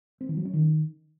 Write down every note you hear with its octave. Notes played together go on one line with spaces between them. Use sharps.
C4
E3
F#3
C#4
D#3